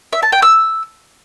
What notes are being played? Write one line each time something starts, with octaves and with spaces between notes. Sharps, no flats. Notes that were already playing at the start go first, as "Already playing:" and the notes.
E5
A5
G5
E6